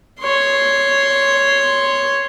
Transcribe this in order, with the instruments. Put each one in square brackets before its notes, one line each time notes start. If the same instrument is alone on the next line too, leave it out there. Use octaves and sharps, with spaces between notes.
[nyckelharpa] C#5 C6